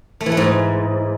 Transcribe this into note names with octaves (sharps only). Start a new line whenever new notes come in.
A3
E3
A3
G#2